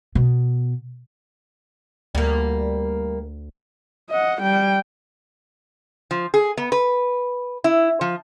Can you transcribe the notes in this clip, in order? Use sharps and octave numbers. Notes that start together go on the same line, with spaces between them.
B2
D2 G3 A#3
D#5 F#5
G3 G5
F3
G#4
B3
B4
E4
F3